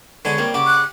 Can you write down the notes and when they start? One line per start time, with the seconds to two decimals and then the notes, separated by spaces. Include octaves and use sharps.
0.25 D3 G#3 B3 C#5 D6
0.38 G3 A#3 C4 G4
0.54 C#3 G4 F#5 D6
0.67 F#6